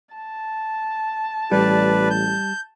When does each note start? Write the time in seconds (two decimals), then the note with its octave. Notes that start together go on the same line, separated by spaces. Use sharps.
0.14 A5
1.51 A1 G3 B4 D5
2.10 G6